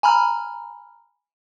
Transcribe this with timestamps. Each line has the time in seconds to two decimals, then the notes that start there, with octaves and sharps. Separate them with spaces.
0.03 G#5 A#5 B5 F6